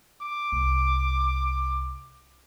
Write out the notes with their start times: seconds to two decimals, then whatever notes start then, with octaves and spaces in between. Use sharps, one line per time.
0.21 D6
0.52 C2